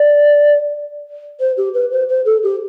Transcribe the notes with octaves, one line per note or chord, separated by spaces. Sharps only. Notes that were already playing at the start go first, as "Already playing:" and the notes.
Already playing: D5
C5
G4
B4
C5
C5
A4
G4